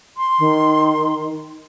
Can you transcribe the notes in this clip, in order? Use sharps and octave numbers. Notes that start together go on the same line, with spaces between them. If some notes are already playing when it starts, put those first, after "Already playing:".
C6
D#3